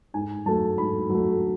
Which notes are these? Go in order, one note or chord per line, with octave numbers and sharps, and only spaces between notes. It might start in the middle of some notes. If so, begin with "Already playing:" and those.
G#2 G#5
F#3 A3 A5
G#2 B5
F#3 A3